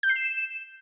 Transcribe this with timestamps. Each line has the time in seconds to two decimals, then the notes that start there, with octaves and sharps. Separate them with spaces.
0.03 G6
0.09 C7
0.16 E7